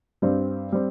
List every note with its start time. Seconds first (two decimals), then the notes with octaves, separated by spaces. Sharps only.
0.22 G2 G3 C4
0.72 G3 C4